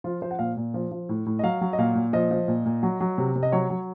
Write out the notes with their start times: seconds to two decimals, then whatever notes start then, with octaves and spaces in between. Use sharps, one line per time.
0.04 F3 F4
0.22 F3 C5
0.31 F#5
0.39 A#2 F5
0.57 A#2
0.74 F3
0.91 F3
1.09 A2
1.26 A2
1.39 D#5
1.43 F#3 F5
1.61 F#3
1.73 D#5
1.78 A#2 F5
1.95 A#2
2.13 F3 D#5
2.31 F3
2.48 A#2
2.66 A#2
2.83 F#3
3.00 F#3
3.18 C3
3.36 C3
3.43 D#5
3.52 F#3 C#5
3.70 F#3